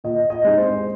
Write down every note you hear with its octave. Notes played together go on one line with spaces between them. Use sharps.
A#2 D#5
D#5
G#3 C4 D#4
C5